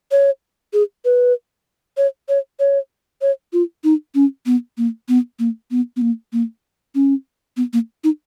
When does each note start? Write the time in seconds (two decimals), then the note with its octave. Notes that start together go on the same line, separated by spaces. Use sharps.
0.11 C#5
0.73 G#4
1.05 B4
1.97 C#5
2.29 C#5
2.60 C#5
3.22 C#5
3.53 F4
3.84 D#4
4.15 C#4
4.46 B3
4.78 A#3
5.09 B3
5.39 A#3
5.71 B3
5.96 B3
6.01 A#3
6.33 A#3
6.95 C#4
7.57 B3
7.73 A#3
8.04 D#4